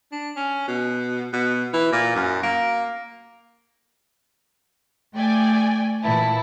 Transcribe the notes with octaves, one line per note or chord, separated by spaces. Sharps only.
D4
C#4
B2
B2
E3
A#2
F#2
A#3
A3 D5 G5 G#5
A#2 E3 E4 A5